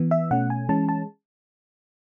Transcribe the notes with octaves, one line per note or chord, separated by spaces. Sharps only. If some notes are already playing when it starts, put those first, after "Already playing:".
Already playing: E3 B3
E5
B2 A3 C#4 F#5
G#5
E3 G#3 C#4 A5
A5